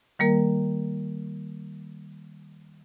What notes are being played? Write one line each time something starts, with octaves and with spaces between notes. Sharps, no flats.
D#3 G3 A#3 A#4